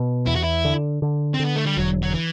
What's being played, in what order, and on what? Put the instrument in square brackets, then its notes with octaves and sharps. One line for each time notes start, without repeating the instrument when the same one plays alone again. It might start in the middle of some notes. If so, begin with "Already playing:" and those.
Already playing: [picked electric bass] B2
[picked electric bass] E2 [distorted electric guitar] E4
[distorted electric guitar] F#4
E4
[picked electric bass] D3
D3
[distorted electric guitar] C4
[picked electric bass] D3
[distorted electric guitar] B3
A3
G3
[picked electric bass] E1 [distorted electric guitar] F#3
[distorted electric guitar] F#3
E3